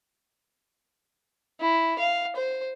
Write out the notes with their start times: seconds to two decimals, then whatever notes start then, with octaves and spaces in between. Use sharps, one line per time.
1.61 E4
1.99 F5
2.36 C5